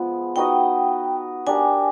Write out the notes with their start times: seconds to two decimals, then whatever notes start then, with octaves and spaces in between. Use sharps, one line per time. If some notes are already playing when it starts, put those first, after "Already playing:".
Already playing: F3 G#3 B3
0.36 D#4 F#4 B4 D#5 G5
1.47 D4 G4 A#4 G#5